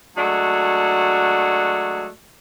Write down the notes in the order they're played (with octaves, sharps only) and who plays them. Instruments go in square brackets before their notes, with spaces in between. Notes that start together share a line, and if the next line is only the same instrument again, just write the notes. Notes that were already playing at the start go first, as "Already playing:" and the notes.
[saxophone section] F#3 G#3 A3 D4 F#4